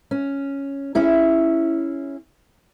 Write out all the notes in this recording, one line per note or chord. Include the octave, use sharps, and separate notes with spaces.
C#4
C#4 E4 G#4